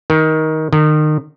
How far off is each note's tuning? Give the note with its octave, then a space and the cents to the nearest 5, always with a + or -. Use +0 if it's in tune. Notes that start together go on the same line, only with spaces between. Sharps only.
D#3 +15
D#3 -30